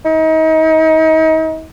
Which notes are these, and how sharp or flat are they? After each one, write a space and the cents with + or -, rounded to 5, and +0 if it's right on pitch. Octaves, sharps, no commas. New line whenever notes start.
D#4 +35